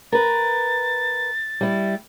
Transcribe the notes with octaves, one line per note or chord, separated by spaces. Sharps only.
A#4 B4 A6
G3 E4